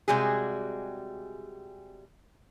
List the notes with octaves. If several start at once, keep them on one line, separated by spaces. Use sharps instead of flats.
C3 G3 G#3 F#4 G#4